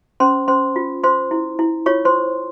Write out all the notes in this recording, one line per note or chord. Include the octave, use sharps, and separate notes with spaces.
C#4 C5 C6
C#4 C5 C6
F4
F4 C5 C6
E4
E4
F4 C#5 C#6
C5 C6